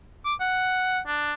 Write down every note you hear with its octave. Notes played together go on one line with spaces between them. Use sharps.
D6
F#5
D4